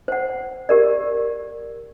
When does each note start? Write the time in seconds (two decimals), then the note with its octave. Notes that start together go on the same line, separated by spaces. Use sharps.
0.08 C5 F#5
0.69 G4 A#4 D5